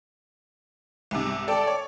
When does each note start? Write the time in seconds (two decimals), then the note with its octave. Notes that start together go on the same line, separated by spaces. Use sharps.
1.11 C2 G#2 C3
1.48 A4 D5 G5 A5
1.67 C#5